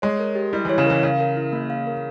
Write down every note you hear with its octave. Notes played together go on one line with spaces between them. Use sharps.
G#3 C#5
A#4
G4
G3 E4
E3 C#5
C#3
E3 A#4
C#3 F5
A#4
E4
A#3
F5
A#4